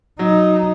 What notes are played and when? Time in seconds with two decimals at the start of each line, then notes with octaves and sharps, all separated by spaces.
0.19 F#3 D#4